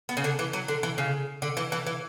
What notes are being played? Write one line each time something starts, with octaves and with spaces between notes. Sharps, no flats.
B3
C#3
D3
E3
F#3
D3
E3
C#3
D3
E3
E3
E3